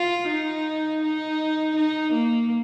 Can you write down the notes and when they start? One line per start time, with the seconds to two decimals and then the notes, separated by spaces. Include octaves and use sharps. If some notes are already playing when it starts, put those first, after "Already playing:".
Already playing: F4
0.28 D#4
1.02 D#4
1.76 D#4
2.13 A#3